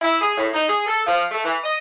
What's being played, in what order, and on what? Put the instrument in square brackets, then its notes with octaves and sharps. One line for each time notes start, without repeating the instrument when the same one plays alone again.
[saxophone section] E4
G#4
A2
D#4
G#4
A4
F3
A3
E3
D#5